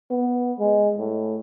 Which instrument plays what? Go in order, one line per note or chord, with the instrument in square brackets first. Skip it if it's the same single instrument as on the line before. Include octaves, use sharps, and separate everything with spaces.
[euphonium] B3
G#3
A2